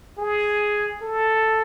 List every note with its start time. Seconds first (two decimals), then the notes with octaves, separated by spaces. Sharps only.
0.18 G#4
1.02 A4